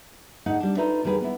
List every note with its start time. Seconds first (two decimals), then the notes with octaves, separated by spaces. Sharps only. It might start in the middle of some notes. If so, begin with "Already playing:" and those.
0.46 D2 G#2 D#4 F#5
0.60 G3 D4
0.77 D#4 F4 A4 B4 D5 E5
1.03 E2 D3 D#3 G3 G#4 B4
1.21 B3 D4 E4